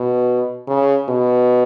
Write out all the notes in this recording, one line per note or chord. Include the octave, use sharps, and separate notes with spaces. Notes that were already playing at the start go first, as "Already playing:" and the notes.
Already playing: B2
C#3
B2